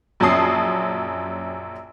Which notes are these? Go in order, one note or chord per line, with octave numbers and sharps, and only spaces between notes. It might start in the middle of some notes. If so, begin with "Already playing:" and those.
A#1 F#2 C#4 A5 D#6 C7